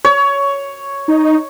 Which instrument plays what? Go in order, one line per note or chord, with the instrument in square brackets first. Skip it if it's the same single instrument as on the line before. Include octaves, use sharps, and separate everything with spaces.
[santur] C#5
[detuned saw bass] D#4